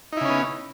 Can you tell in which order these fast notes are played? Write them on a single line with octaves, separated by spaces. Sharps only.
D#4 E4 C#3 C#4 B3